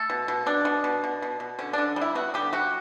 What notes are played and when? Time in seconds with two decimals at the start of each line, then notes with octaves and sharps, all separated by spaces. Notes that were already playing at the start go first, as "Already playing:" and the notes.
Already playing: A3 A4
0.10 B2
0.28 B2
0.46 B2 D4
0.65 B2
0.84 B2
1.04 B2
1.22 B2
1.40 B2
1.59 D3 C#4
1.73 D3 D4
1.96 G3
2.01 E4
2.15 B3 F#4
2.34 D3 G4
2.53 G3 F#4